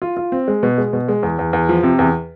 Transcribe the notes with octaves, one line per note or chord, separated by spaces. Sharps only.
F4
F4
C4
G#3
B2
G#3
B2
G#3
E2
E2
E2
F3
C3
E2